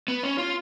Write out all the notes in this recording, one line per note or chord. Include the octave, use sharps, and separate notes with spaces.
B3
C#4
F4